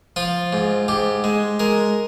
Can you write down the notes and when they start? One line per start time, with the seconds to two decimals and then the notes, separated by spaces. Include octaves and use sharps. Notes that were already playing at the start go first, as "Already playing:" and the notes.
0.16 F3 F4
0.53 G#2
0.88 G#2 G4
1.24 G#3
1.59 G#3 A#4